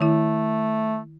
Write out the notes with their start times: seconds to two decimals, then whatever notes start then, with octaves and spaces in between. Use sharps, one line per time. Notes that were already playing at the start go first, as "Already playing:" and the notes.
0.01 D#3 A3 E4